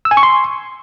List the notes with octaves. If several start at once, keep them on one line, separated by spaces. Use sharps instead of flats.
E6
G#5
C#6
C6